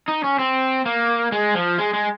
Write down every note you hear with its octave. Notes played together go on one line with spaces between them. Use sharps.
D#4
C#4
C4
A#3
G#3
F3
G#3
G#3